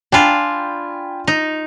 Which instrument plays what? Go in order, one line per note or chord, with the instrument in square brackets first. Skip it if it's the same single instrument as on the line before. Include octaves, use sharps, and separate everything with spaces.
[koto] D4 F4 [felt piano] G5 G#5 B5
[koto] D#4